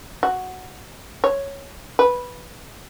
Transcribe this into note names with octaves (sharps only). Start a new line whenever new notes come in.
F#4
C#5
B4